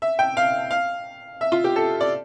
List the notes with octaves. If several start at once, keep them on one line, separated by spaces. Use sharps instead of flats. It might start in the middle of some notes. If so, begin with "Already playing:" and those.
E5
G5
F5
F5
E5
F4
G4
A4
D5